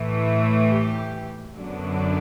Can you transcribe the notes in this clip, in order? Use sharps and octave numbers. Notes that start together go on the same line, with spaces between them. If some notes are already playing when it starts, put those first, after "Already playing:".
Already playing: A2 E3 A3
G4
F#2 D3 F#3 B3 D4